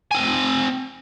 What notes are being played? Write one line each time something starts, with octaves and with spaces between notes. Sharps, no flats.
C4 G#5